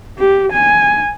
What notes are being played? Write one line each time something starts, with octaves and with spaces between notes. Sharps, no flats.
G4
G#5